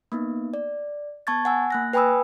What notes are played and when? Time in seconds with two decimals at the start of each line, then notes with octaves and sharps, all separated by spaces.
0.12 A#3 B3 D#4
0.54 D5
1.27 B3 A5 C#6 G#6 A6
1.45 F#5 G#5 E6
1.70 A#3 F#6 A#6
1.93 B4 G5 G#5 B5 D#6 E6